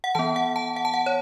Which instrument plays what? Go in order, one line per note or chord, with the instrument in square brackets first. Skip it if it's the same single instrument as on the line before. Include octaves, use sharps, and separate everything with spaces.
[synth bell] F#5
E3 B3 A5
F#5
A5
F#5
A5
F#5
C#5